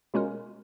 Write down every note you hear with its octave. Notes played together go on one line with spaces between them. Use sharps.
B2 G#3 C#4 F4 A#4